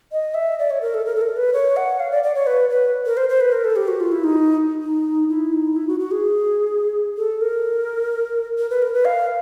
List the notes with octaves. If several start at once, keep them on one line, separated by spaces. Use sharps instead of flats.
D#5
E5
D5
C#5
A#4
A4
A#4
A4
A#4
B4
C#5
F#5
F5
D5
D5
C#5
B4
B4
A#4
C5
C5
B4
A#4
A4
G4
F#4
F4
E4
D#4
D#4
E4
D#4
E4
F#4
F#4
G#4
A4
A#4
A#4
B4
A#4
B4
F5